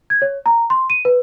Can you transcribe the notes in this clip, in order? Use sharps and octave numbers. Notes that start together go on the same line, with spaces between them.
G#6
C#5
A#5
C6
D#7
B4